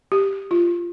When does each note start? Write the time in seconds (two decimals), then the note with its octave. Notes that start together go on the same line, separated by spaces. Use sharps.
0.12 G4
0.51 F4